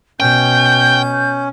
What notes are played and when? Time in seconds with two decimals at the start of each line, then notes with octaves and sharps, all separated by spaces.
0.20 B2 C#4 G5 G6